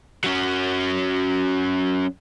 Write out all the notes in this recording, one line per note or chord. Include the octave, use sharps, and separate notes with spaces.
F#3 C#4